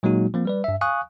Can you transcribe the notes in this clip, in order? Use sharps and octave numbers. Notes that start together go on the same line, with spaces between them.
A#2 F#3 G#3 A#3 D#4 F#4
F3 A#3 C4
G3 B4 D5
G2 E5
F5 G#5 C#6 D#6 F#6